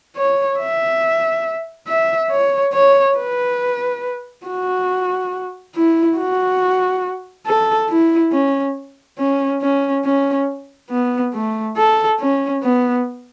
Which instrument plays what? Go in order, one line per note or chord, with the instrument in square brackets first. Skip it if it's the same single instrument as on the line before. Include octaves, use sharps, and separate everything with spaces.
[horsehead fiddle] C#5
E5
E5
C#5
C#5
B4
F#4
E4
F#4
A4
E4
C#4
C#4
C#4
C#4
B3
A3
A4
C#4
B3